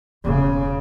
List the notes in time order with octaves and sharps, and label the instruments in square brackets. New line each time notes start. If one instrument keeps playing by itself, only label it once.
[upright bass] E1 [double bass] C#3